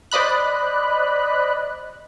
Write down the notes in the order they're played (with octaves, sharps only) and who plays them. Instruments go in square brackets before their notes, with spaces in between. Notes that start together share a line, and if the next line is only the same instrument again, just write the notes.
[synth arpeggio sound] C5 D5 D#5 B5 F#6